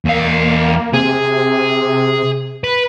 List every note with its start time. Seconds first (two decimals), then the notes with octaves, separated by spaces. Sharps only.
0.05 E2 A#3 F5
0.94 C3 G#4
2.64 B4